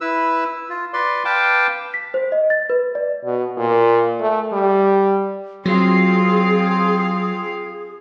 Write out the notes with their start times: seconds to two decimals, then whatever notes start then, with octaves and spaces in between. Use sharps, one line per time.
0.01 E4 B4 E6
0.70 F4
0.93 B4 D5 C6
1.25 B4 F5 G5 A5 D6
1.94 B6
2.14 C5
2.32 D#5
2.50 A6
2.70 B4
2.95 D5
3.25 B2
3.57 A#2
4.20 A3
4.52 G3
5.65 F#3 C4 F4 G#4 F5